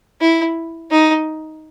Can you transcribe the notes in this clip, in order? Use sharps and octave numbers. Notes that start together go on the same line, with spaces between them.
E4
D#4